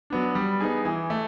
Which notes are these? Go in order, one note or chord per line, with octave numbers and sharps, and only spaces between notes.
F#3 B3 D4
G3
B3 D#4 G#4
E3
A3